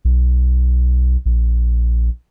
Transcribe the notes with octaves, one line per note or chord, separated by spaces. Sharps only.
B1
A#1